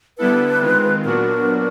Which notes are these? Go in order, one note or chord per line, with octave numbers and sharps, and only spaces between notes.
D3 G3 B3 E4 A4 B4
D#3 G#3 C4 F4
A#2 F#3 B3 D4 F#4 A#4